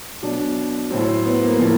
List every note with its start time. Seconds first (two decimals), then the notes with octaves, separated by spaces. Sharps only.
0.22 B2 F#3 D4
0.90 A2 F#3 C4
1.07 C4
1.25 B3
1.42 A#3
1.58 A2 F3 A#3